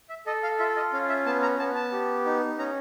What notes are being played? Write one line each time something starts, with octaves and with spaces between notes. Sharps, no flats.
E5
A4 D#5
F5
F4 E5
D#5
C#4 F5
E5
B3 A5
A#5
B3 A5
A5
G4
D#4
C#4 A#5